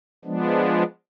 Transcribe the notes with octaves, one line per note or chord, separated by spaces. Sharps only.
F3 G#3 B3 D4